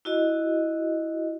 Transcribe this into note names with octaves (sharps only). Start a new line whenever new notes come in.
E4 F#4 D#5